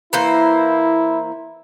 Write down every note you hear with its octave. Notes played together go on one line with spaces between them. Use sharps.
E3 A#3 E4 C5